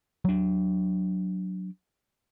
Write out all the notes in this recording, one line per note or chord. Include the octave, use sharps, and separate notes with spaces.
F#3 D4